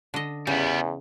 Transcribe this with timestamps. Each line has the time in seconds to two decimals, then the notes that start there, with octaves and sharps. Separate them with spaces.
0.14 D3 D#5
0.47 E2 C#3 G3 B3